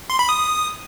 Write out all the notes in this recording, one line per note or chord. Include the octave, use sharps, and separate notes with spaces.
C6
B5
D#6